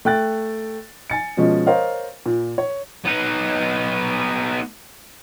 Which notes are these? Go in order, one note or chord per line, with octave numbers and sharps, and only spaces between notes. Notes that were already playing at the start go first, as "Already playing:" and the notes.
A3 G5 F#6 A6
G#5 A6 C#7
B2 F3 G#3 C#4
A#4 C5 C#5 D#5 F5
A#2
C#5
B3 D#4